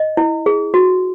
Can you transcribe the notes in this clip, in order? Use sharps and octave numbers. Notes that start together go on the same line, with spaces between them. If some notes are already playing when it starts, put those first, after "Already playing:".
Already playing: D#5
E4
G#4
F#4